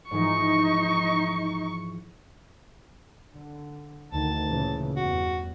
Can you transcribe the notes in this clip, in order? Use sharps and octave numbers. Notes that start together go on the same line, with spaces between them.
G#2 E3 F3 D#4 C#6
D3
D2 D#3 A5
A#2 C#3 E3
E2 G2 F#4